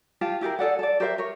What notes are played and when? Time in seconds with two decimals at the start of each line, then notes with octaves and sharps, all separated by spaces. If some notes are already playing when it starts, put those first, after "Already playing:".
0.21 F4 G4 F5 A5
0.41 E4 G4 G#4 A#4
0.59 G#4 A4 D5 F#5
0.79 A4 D5
1.00 G4 A#4 C5 E5
1.18 A#4 C#5